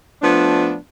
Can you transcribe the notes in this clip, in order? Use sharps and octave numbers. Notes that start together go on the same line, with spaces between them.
F3 A3 B3 D4